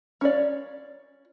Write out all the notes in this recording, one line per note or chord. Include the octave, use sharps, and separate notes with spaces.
C#4 F4 C#5 D5